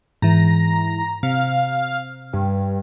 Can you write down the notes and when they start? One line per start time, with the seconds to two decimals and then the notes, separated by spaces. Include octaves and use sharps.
0.22 G#2 E3 A#5
1.23 C3 F5
2.33 G2